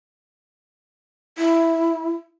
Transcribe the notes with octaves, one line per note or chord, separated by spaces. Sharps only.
E4